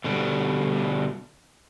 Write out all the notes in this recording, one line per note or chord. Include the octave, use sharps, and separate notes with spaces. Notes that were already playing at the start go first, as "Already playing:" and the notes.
B2 D3 G3